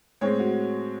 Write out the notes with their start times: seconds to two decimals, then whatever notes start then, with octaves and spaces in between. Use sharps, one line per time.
0.21 A2 G#3 C4 C#5
0.39 F#4